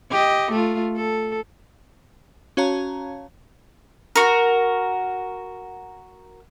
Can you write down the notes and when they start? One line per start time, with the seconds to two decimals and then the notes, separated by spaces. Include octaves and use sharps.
0.11 G4 D#5
0.51 A3 F4
0.97 A4
2.57 C#4 F#4 C#5 F5 A5 A#5
4.16 F#4 A#4